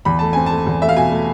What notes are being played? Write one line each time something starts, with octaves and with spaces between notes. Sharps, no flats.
E2 B5
A3 A5
C4 G#5
A3 A5
E2
A3 E5
F5
B2 G#5
A3